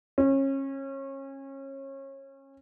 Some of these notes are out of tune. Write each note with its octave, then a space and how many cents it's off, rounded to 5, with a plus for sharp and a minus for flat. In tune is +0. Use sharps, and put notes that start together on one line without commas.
C#4 -30